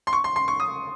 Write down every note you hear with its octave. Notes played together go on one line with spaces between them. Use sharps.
C6
C#6
C6
C6
C#6
D#6